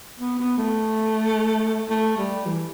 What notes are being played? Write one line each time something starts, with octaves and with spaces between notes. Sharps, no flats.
B3
B3
A3
A3
G3
E3